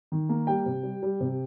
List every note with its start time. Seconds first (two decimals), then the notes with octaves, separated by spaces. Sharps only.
0.12 D#3
0.29 A#3
0.47 G3 G5
0.66 C3
0.83 G3
1.03 G3
1.21 C3